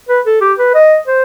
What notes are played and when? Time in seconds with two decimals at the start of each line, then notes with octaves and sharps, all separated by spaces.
0.09 B4
0.25 A4
0.41 G4
0.58 B4
0.74 D#5
1.07 C5